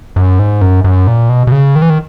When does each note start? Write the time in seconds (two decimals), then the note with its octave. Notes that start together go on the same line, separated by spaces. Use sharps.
0.16 F#2
0.39 G#2
0.61 F#2
0.84 F#2
1.07 A#2
1.29 B2
1.47 B2
1.52 C#3
1.76 D#3
1.82 E3
1.90 D#3